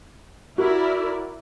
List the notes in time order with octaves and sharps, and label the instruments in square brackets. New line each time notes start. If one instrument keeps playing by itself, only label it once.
[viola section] E4 A#4 D5 [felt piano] F#4